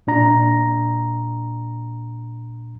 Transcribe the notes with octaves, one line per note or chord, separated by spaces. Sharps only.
A#2 D4 A#5